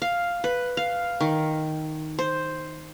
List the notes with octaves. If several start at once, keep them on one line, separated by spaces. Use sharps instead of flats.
F5
B4
F5
D#3
C5